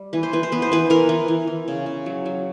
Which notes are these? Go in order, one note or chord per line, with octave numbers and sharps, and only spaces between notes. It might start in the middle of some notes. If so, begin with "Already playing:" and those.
Already playing: G3
E3 B4
C5
E3 B4
C5
B3 B4
C5
E3 B4
E3 A#4
E3
E3
E3
C#3
C#3
F#3
F#3